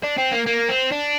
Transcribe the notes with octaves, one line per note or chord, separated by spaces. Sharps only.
D4
C4
A#3
A#3
C4
D4